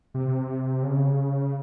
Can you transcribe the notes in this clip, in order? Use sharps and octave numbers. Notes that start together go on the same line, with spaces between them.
C3
C#3